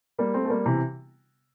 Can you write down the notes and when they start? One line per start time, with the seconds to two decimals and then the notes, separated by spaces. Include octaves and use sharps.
0.19 G3 A#3
0.34 A3 C4
0.45 A3
0.50 G3 A#3
0.66 C3 E3